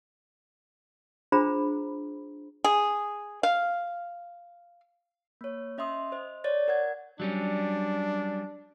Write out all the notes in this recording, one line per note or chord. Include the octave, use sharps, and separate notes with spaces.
D4 F4 G#4 C5 A#5 B5
G#4
F5
A#3 C#5
C#4 D#5 E5 C6 D#6
C5 D#5
C#5 D5 A6
A#4 F#5 G#6
F#3 G3 C#4 D4